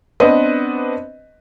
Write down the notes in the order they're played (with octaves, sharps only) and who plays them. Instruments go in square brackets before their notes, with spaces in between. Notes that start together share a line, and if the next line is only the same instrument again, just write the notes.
[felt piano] B3 C4 D4 B4 D#5